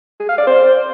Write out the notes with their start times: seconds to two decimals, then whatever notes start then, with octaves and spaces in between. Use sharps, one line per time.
0.20 G#4
0.29 F5
0.38 D5
0.47 C5